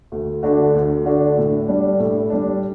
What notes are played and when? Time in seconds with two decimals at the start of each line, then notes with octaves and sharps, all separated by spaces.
0.12 D2
0.43 D3 A3 D4 F#4
0.75 D2
1.06 D3 A3 D4 F#4
1.38 A2
1.68 G3 D4
1.99 A2
2.30 G3 D4